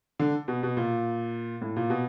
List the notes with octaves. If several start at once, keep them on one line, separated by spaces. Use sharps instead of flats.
D3
B2
B2
A#2
A2
A#2
B2